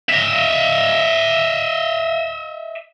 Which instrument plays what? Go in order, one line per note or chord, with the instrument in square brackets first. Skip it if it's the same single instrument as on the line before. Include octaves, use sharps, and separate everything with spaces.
[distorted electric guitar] D#5 E5